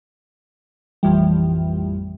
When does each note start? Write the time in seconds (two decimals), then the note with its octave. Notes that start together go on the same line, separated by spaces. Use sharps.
1.03 A1 F2 E3 G3